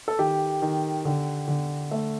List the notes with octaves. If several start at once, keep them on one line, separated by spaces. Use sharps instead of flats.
A4
D#3 G4
D#3
D3
D3
A3